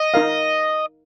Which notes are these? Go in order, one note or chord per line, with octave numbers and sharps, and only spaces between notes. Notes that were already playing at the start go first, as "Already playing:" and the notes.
Already playing: D#5
D#4 A#4 F5